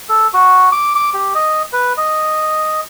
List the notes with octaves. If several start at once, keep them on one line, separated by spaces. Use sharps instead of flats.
A4
F#4
D6
D6
G4
D#5
B4
D#5